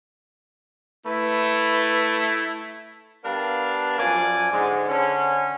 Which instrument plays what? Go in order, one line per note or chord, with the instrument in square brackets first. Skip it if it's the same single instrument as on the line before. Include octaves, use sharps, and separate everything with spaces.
[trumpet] A3 [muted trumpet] E4 [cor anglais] B4
[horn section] G3 B3 D4 A#4 F5 A5
F#2 F3 D5 G#5
G#2 D3 G#3
D3 C#4